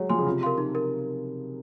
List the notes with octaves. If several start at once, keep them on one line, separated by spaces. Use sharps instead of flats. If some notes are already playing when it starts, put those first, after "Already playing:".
Already playing: F#3 G#3 C#5
F3 G#5 C6
C#3
C3 F4
A#4 F5 C6
D#4
A#4